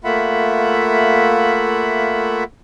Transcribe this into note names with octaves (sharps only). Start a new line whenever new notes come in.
A3 A#3 F4 E5 F#5 B5